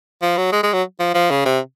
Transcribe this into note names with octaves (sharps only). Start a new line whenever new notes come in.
F3
F#3
G#3
G#3
F#3
F3
F3
C#3
C3